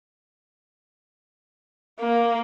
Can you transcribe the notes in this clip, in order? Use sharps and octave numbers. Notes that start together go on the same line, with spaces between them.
A#3